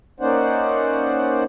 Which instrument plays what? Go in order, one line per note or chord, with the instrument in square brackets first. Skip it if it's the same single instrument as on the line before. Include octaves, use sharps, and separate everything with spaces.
[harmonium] A#3 C#4 D#4 C5 D5 F#5